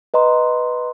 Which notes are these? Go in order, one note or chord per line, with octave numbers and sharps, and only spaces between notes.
B4 D#5 A#5 C6